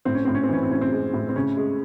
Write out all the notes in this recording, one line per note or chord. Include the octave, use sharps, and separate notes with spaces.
A2 C4
C#4
A2 C4
C#4
C4
E3 C#4
C4
A2 C#4
C4
G#3
A2
C4
C#3 C#4
G#3